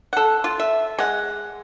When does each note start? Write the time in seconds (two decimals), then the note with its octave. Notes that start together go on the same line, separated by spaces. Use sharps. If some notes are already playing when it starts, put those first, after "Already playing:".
0.13 A4 F#5
0.44 F4
0.60 E5
0.99 G#3 F#5